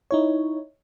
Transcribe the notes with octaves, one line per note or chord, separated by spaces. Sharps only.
D#4 E4 C#5